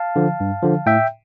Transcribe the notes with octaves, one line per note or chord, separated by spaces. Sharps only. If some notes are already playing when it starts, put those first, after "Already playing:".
Already playing: F5 A5
D3 F3
G2
D3 F3
A2 E5 G5